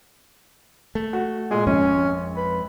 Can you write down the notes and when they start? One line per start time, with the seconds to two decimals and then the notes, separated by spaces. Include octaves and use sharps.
0.95 A3
1.13 F#4
1.51 A#2 G#3
1.67 G#1 F2 C#4
2.37 B4